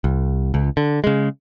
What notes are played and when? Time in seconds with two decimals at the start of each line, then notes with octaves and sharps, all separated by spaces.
0.04 C2
0.54 C#2
0.77 D3
1.04 C#3 G#3